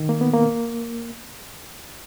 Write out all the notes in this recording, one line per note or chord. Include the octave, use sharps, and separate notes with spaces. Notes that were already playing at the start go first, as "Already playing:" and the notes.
Already playing: D#3
A#3
B3
A#3